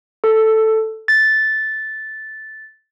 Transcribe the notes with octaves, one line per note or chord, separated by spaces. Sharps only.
A4
A6